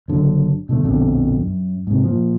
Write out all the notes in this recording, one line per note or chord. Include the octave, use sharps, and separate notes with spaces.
F#1 D3 F#3
B2 D3 F#3 A3
A#1 F2 B2 D3
F#2
G#2 C3
A#2 F3